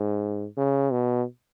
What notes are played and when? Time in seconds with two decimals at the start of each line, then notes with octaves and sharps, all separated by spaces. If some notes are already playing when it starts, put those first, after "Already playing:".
Already playing: G#2
0.57 C#3
0.92 B2